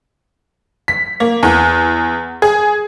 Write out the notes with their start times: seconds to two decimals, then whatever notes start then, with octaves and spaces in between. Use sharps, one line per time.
0.88 B6
1.20 A#3
1.43 E2
2.42 G#4